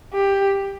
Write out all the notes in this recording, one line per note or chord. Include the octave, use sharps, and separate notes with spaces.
G4